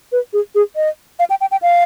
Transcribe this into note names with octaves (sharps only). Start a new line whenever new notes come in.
B4
G#4
G#4
D#5
F5
G5
G5
G5
F5